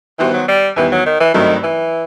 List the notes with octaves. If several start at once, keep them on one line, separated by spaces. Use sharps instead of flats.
D#3 E3 G3 B3 F#4 C5
F#3
G3
E2 D#3 E3 G3 B3
F#3
D#3
E3
G2 D#3 F#3 A3 C4 D#4
E3